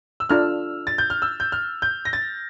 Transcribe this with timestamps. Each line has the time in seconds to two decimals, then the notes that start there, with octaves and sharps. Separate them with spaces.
0.20 E6
0.29 D4 F4 A4 D5 F6
0.87 A6
0.98 G6
1.10 F6
1.22 E6
1.40 G6
1.52 F6
1.82 G6
2.05 A#6
2.13 A6